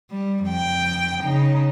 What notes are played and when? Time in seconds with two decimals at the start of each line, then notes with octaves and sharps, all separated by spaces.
0.11 G3
0.44 F2 G5
1.23 C#3 D#4